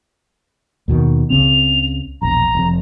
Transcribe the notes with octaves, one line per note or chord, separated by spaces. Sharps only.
D#2 B2 D#3
C#2 C#3 C4 F7
E1 A#1 A#5
F1 F2